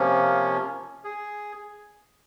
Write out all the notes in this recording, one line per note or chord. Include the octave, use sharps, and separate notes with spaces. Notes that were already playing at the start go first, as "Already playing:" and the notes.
Already playing: C3 F3 A#3 C#4
G#4